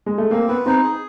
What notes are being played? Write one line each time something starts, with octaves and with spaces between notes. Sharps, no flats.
G#3
A3
A#3 C4
B3 B4
C4 D#4
G#4